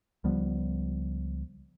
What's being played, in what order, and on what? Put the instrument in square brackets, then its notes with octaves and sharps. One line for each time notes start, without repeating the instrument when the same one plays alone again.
[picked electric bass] C#2 F3 G3 B3